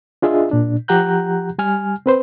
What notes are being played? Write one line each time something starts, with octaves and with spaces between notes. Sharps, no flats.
D4 F4 G#4 D#5 E5
A#2 D4
F3 G4 F#5 A#5 F#6 G6
G3 G#5 F6
C4 B4 C5